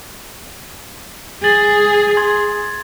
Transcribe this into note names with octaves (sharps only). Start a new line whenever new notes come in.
G#4 A6 F#7
C6 G#6